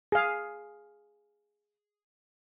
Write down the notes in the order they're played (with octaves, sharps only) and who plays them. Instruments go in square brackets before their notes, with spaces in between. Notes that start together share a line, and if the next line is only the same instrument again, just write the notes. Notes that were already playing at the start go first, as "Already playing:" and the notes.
[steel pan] G#4 F5